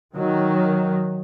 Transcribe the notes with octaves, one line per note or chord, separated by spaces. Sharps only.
D#3 F#3